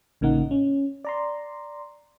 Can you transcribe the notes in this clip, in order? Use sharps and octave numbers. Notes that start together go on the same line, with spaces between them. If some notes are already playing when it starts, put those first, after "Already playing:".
A1 C#3 A#3 D#4 F#5
C#4
D5 A#5 C6